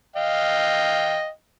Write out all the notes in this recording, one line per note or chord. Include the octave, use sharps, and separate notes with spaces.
D#5 F5 G5